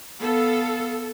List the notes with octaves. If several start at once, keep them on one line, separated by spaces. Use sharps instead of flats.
B3 A4 F5